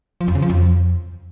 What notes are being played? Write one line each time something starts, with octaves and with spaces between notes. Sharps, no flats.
F3
F2
C#3
F3
F2